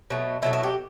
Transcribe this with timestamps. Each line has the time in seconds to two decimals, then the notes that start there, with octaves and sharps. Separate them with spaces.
0.10 B2 F#3 A3
0.42 B2 F#3 A3 E4
0.53 E4
0.63 G4